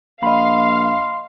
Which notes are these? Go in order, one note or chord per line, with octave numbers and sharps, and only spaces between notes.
A#1 D#5 F5 B5 C6